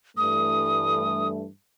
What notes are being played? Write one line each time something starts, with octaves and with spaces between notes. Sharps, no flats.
G2 E3 A3 D#6